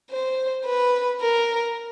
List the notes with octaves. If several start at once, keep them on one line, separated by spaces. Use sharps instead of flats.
C5
B4
A#4